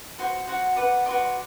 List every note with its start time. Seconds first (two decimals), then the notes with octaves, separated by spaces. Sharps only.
0.19 F#4 C5 C6
0.47 F#4 C5 F#5
0.76 F#4 B4 D5 F#5
1.06 F#4 B4 D5 C6